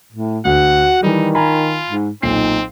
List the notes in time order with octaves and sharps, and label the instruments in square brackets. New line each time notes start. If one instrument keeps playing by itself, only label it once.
[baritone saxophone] A2
[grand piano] D2 [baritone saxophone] F#4 [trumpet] F#5
[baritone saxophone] D#3 [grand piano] E3 G3 [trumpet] D#4
[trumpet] F4 [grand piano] G#5 A#5 B5
[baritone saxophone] G#2
[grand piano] B1 A#2 C7 [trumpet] C4 [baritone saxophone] D#4